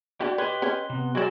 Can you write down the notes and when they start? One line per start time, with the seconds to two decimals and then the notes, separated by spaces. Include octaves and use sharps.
0.20 D4 E4 F#4 G5
0.38 G4 B4 C#5 D#5 C6 F#6 G7
0.62 C#4 C#5
0.90 C3 B3
1.15 F#3 G#3 F#4 D5 G#5 G#6 E7